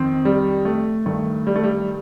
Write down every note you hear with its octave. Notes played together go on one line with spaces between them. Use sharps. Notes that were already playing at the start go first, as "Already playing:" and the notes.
Already playing: F2 D#3 C4
G3
A3
G2 D#3 A3
G3
A3
G3